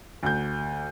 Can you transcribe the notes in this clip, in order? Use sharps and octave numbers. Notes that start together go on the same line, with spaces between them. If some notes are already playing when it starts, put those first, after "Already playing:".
D2 G6